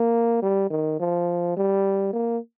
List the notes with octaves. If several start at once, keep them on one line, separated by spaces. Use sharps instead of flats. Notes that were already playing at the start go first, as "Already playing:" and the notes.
Already playing: A#3
G3
D#3
F3
G3
A#3